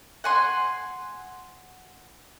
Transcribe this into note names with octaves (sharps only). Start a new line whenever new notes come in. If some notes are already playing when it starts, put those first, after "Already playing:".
F#5 G#5 C6